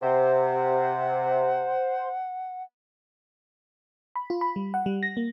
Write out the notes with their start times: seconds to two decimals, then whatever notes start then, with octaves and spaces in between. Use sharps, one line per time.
0.02 C3 C5 F#5
4.16 B5
4.30 F4
4.41 B5
4.56 G3
4.74 F#5
4.86 G3
5.03 A#6
5.17 A#3